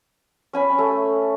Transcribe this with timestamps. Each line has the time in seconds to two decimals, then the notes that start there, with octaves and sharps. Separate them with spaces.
0.53 C#4 G#5 B5
0.78 A3